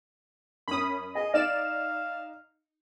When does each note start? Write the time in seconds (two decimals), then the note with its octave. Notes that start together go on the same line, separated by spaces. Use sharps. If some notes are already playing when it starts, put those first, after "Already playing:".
0.68 F#2 C#4 B5 D#6
1.15 G#4 D#5
1.34 D#4 D5 F5 E7